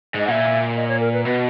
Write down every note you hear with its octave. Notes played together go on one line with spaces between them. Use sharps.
G#2 D#5
A#2 E5 F#5
D#5
C#5
A#4
B4
B2 B4